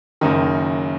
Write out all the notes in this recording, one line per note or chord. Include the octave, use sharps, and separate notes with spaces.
F#1 F#2 D#3